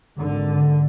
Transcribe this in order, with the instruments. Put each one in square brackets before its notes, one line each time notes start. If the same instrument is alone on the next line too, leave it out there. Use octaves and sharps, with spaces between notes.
[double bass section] G#1 D3